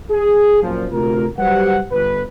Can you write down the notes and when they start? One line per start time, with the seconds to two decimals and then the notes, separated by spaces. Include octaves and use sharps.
0.10 G#4
0.62 F#2 A#2 F3
0.91 D2 C3 A3 F4 A#4
1.38 F#3 G3 G4 B4 C5 F#5
1.91 G1 B4